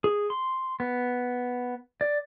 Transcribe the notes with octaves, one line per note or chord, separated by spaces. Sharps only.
G#4
C6
B3
D5